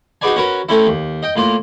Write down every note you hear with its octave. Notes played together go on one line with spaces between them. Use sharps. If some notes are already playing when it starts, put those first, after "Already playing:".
D#4 F#4 G#4 B4 D5 G#5
C#4 F#4 A#4 B4
A3 C4 C#4 E4
D#2
D#5 G5
A2 A#3 F4